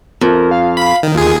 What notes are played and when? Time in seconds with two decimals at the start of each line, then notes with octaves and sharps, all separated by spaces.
0.21 F2 A#4
0.51 F5
0.77 B5
1.03 D#3
1.15 D#2 F4 G#4